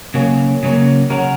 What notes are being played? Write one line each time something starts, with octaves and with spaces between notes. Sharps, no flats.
C#3 F#3 A#3 C#4
C#3 F#3 A#3 C#4
C#3 F#3 C#4 F#4 A#4